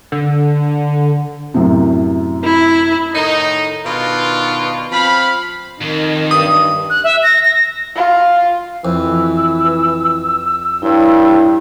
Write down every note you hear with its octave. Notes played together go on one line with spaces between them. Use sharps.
D3
F#2 A2 C3
E4
A2 D#3 D#4
B2 D#3 B3 D4 F4
F3 C4 F5 B5
F2 D#3
G2 D#6
F#6
E5
A#6
A#6
F4
F2 E3 E6
G2 E4 C#5 G5